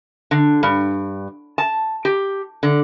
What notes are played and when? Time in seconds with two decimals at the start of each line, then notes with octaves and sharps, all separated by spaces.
0.31 D3
0.63 G2
1.58 A5
2.05 G4
2.63 D3